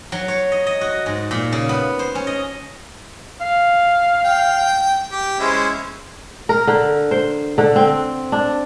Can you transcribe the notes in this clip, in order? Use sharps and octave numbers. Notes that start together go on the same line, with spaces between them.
F#3
C#5
D#5
D#5
F#4
G#2
A#2
C#3
B3
C5
C#4
D#5
F5
G5
G4
G#3 C#4 E4 C5
A#4
D3
C5
D3
C4
D4